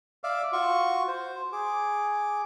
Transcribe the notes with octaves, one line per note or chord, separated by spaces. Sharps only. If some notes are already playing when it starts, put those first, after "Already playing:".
D5 E5 F5 D6
F4 F#4 C#6
C5
G#4 D6